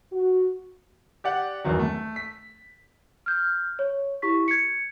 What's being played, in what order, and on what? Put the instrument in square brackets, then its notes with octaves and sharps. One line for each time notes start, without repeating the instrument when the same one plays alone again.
[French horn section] F#4
[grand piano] G4 D5 F#5
G1 E2 D#3 F#3
A3
B6
[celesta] F6 G6
C#5
E4 G4 C#6 B6
G#6 C#7